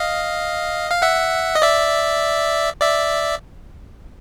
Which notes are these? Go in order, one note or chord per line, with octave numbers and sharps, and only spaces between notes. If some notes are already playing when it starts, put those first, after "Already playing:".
Already playing: D#5 F5
F5
E5 F#5
D#5
D5 E5
D5 E5